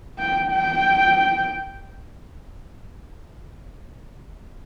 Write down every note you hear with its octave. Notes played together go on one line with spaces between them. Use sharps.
G5
G5